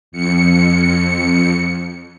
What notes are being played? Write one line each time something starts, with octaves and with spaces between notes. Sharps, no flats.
F2 C#7